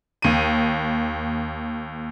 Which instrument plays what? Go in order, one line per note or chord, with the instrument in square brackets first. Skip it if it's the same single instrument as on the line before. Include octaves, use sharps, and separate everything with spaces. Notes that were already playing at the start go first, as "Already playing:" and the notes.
[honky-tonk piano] D#2 D#7